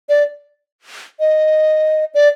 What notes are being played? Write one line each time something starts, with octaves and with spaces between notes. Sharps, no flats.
D5
D#5
D5